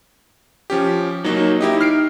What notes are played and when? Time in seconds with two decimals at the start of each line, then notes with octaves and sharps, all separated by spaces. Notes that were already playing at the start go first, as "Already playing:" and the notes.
0.70 F3 C#4 G4
1.24 F#3 A#3 D#4 C#5 D#5
1.61 D#4 E4 G4 D#5
1.81 F6 C7 D7